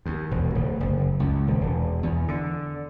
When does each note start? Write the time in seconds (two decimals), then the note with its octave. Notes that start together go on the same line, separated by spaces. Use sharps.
0.06 D#2
0.31 E1
0.55 D1
0.80 F#1
1.20 C#2
1.47 D#1
1.61 E1
2.03 E2
2.28 D3